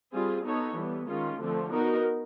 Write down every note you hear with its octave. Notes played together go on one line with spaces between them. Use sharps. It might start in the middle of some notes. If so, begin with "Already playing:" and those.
G3 C4 F4 G#4
B3 D#4 F#4 A4 C#5
E3 G3 B3
D#3 G#3 C#4 F4
D3 F3 A3 C4
B3 D#4 F#4 A#4